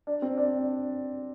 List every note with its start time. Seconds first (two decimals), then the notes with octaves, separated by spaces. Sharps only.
0.07 D4
0.22 C4
0.37 D4